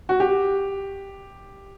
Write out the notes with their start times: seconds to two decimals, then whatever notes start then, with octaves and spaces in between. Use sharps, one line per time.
0.09 F#4
0.20 G4